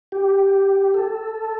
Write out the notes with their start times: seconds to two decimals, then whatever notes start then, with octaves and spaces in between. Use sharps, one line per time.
0.12 G4
0.94 A4